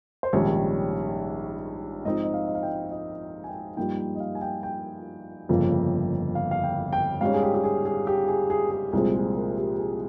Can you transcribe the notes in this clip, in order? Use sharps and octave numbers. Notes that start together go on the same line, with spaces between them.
C5
A#1 G#2 D#3 G3 C#4 C#5
G#2 F3 C4 D#4 D#5
D#5
F5
D#5
F5
G5
D#5
G#5
G5
G2 F3 A#3 D#4 G5
G5
D#5
F5
G#5
G5
G5
G1 F2 C#3 F3 A#3
F5
F5
G5
G5
G#2 G3 C#4 F5
G#4
G4
G4
G#4
G#4
G4
G#4
G#4
G#4
C2 A#2 F3 G#3 C4 G#4
G#4
A#4
G4
G#4